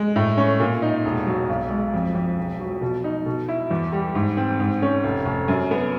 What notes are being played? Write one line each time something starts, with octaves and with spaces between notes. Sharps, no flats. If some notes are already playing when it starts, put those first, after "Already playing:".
Already playing: G#3
A2
C#4
A#2
D#4
E1
F#3
B1
G#3
F2
F2
E1
F#3
B2
D#4
B2
E4
E2
G3
G#2
C4
G#2
C#4
F1
F1
F#2
B3